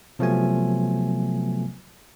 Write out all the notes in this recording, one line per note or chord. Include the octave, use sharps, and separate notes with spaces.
C3 F3 F#3 A3 B3 G#5